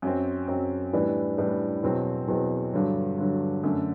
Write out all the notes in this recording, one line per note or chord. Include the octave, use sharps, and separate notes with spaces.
F#2 F#3 C4
F#2 F#3 C4
A2 E3 G3 D4
A2 E3 G3 D4
E2 B2 F#3 C4
E2 B2 F#3 C4
G2 D3 F#3
G2 D3 F#3
F#2 D3 A3